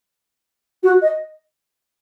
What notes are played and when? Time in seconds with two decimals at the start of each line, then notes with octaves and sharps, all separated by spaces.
0.83 F#4
1.02 D#5